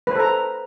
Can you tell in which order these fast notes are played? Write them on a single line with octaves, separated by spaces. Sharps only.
B4 C5 A4 A#5